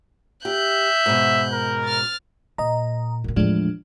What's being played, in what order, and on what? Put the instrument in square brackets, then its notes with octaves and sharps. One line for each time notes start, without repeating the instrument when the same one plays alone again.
[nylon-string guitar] G4 [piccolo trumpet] E5 [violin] F#6 G6
[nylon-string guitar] G#2 B2
[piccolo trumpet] A#4
[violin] F6 A6
[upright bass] A#2 [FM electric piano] D#5 A#5
[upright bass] F#2 A#2
[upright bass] E2 A2 [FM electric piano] F3 G#3 D4